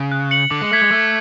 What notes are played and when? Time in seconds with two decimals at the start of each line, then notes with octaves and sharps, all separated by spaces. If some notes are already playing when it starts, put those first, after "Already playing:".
Already playing: C#3
0.12 F#6
0.31 C#7 F#7
0.51 D3 D6
0.62 G#3
0.71 A3 G#6 B6 F#7
0.81 G#3
0.91 A3 D6